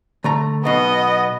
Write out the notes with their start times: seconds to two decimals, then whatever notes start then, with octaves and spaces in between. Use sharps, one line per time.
0.24 D3 A3 A#5
0.65 B1 B2 B3 D#5